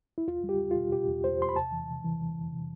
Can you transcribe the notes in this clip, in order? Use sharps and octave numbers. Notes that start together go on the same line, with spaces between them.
E4
E2 F4
G3
G4
E2
B2 F4
B2 G4
E2
E2 C5
E2 C6
B5
C3 A5
E3
C3
E3
E3
F2
C3